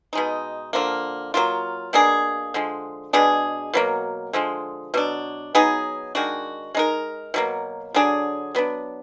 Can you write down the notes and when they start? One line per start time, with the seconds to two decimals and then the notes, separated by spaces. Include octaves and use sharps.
0.13 B2 G#3 D#4
0.73 D3 F3 A#3
1.34 F#3 A#3 F4
1.93 B2 A#3 D4 G#4
2.54 D3 F3 G#3
3.13 B2 G#3 D4 G#4
3.74 B2 F#3 A#3
4.33 D3 F3 G#3
4.94 B2 F#3 D4
5.55 F#3 B3 D#4 G#4
6.15 D#3 G#3 D4 F#4
6.75 G#3 D#4 A#4
7.34 B2 F#3 A#3
7.94 D3 F#3 D4 G#4
8.55 F#3 B3 D4